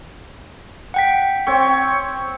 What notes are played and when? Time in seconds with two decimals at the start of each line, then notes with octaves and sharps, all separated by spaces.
0.94 F#5 G5 B6
1.47 C4 C#5